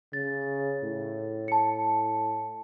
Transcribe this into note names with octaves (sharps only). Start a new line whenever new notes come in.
C#3 A6
A2
A5 C#7